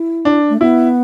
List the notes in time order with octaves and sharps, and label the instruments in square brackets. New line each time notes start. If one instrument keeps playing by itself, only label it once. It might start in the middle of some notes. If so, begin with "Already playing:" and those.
Already playing: [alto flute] E4
[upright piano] D4
[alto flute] A3
[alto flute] B3 [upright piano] E4